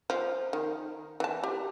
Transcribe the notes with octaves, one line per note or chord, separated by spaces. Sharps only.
F3
D#3
E3 A5
G4